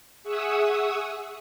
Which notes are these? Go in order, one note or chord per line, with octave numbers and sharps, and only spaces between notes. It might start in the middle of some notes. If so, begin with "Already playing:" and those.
G#4 E5 F#5 C#6 D#6 E6